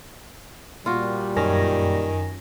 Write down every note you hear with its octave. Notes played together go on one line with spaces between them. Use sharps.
A#2 G3 F4 F#4
F#2 D#3 C#4 G#5 A#6